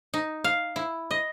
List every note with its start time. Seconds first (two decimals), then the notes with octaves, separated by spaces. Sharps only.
0.14 D#4
0.44 F5
0.76 E4
1.11 D#5